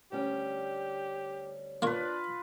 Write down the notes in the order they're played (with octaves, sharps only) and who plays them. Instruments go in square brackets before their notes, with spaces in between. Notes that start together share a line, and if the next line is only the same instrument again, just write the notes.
[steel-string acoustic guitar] D2 G3 C#4 [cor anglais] G4
[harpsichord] A#3 C#5 [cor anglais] D4 [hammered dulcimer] F4 B4